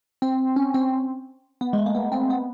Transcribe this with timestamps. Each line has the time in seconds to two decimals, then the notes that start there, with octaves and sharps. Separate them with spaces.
0.22 C4
0.56 C#4
0.74 C4
1.61 B3
1.73 G#3
1.78 A3
1.86 A#3
1.95 B3
2.12 C4
2.30 B3